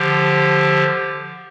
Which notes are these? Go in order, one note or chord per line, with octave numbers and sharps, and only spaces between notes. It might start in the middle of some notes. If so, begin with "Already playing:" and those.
Already playing: D3 F3 G4